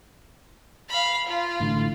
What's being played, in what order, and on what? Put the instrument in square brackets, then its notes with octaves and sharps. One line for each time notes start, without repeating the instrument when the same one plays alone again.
[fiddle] F5 B5
F4
[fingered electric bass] A1 A2 D3